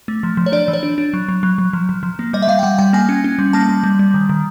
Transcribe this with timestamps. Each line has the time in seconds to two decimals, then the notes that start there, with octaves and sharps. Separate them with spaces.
0.08 A3
0.23 F3
0.37 F3
0.46 C#5
0.52 D4 D5
0.68 E3
0.73 C#5
0.83 D4
0.98 D4
1.13 F#3
1.29 F#3
1.43 F#3
1.58 F#3
1.73 F3
1.89 F3
2.03 F3
2.19 A#3
2.33 G3 D#5
2.42 E5
2.48 G3 F5
2.59 G5
2.63 G3 F#5
2.78 G3 G5
2.93 A#3 G#5
3.09 C#4
3.24 C#4
3.39 G3
3.53 A#3 A5
3.69 G3
3.84 G3
3.99 G3
4.14 D#3
4.29 D#3